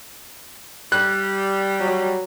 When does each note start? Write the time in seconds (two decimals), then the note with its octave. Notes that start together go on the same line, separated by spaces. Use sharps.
0.92 G3 F#6
1.81 F#3